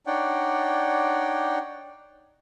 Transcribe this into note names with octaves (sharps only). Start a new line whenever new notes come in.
D4 D#4 C#5 D5 F#5 G5